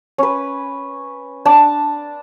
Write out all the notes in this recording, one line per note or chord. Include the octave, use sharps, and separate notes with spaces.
C#4 B4
D4 A5